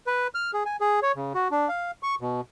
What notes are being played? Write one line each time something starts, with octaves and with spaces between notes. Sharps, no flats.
B4
F6
G#4
G#5
G#4
C#5
C#3
F#4
D4
F5
C#6
B2